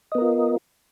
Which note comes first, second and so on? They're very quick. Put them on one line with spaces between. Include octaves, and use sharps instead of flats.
D#5 B3 A#4 F4